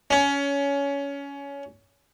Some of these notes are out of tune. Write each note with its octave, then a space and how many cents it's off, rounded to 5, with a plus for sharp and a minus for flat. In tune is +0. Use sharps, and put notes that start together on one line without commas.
C#4 +20